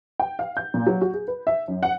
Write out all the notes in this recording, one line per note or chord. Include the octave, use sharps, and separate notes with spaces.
G5
F5
G6
A#2
F#3
F#4
G#4
B4
E5
F#2
F#5